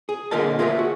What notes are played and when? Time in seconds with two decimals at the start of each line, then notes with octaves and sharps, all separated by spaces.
0.09 G#4
0.31 A#2 D3 F4 A#4 D#5 A5
0.59 F4 G#4 A#4 C#5 E5
0.79 F#4